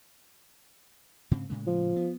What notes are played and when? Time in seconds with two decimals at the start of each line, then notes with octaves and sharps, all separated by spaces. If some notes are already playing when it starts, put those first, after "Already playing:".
1.31 G#2 C#3 C4
1.50 A2 C#3 G#3
1.67 F3
1.96 B3